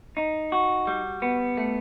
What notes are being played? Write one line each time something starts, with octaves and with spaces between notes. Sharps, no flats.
D#4
F#4
G3
B3
A3